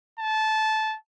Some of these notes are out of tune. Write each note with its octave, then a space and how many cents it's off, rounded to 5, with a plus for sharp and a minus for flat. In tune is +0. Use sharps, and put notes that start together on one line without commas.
A5 -15